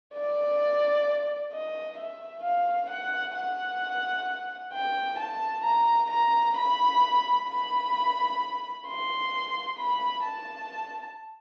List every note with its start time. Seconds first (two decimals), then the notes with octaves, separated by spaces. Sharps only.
0.14 D5
1.52 D#5
1.98 E5
2.44 F5
2.90 F#5
3.35 F#5
4.73 G5
5.19 A5
5.64 A#5
6.10 A#5
6.57 B5
7.48 B5
8.87 C6
9.78 B5
10.24 A5